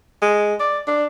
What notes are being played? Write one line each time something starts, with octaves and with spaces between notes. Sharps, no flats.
G#3
D5
D4